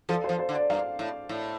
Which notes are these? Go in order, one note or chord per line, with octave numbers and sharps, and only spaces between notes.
F3 A4
F3 C5
C5
D3
D5
G2 F5
A2
A2